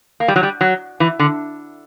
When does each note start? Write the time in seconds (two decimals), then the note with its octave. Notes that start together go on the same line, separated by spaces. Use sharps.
0.20 A#3
0.28 G3
0.36 F#3
0.43 G3
0.61 F#3
1.00 E3
1.19 D3